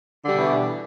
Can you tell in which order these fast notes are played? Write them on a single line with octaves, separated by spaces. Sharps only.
D3 G3 B2 E3